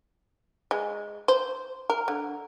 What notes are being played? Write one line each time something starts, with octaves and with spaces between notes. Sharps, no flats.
G#3
C5
A#4
D3